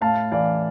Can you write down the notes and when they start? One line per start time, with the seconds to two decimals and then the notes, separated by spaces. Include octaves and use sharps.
0.01 A2 F5 A5
0.32 E3 D5 F5